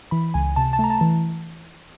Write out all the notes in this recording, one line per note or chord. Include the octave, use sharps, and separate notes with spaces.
E3 B5
C#2 G#5
C3 A5
A5
A3 A#5
A5
E3